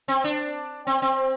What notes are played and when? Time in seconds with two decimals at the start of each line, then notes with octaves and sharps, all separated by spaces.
0.08 C4
0.24 D4
0.87 C4
1.02 C4